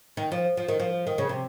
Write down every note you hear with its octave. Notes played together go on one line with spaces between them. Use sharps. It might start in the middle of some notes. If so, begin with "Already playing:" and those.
D#3
F3
F3
D#3
F3
D#3
C#3
C3